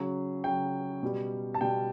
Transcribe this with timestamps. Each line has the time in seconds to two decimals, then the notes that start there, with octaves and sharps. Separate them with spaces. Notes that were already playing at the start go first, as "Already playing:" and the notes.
Already playing: C#3 F#3
0.44 C#3 F#3 G5
1.03 B2 G3
1.54 A5
1.61 B2 G3 G5